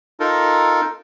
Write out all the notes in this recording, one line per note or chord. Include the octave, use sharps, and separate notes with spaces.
D#4 F4 A4 A#4